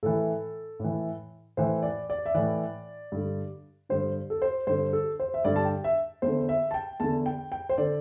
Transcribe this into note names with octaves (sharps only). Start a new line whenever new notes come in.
A2 E3 A4
A2 E3
A2 E3 C5
D5
D5
E5
A2 E3 D5
G2 D3
G2 D3 C5
A4
C5
G2 D3 C5
A4
C5
E5
G2 D3 D5
A5
G5
E5
E2 D3 C5
E5
A5
G5
E2 D3 A5
G5
G5
C5
D3 D5